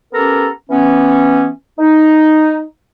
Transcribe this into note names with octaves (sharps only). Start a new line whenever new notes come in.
B3 C#4 G4 A4 A#4 A#5
E3 B3 C#4
D#4